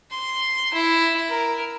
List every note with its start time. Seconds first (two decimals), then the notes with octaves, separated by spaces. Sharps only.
0.11 C6
0.74 E4
1.29 A#4